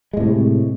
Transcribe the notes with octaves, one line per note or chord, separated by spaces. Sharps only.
A2 C3 G#3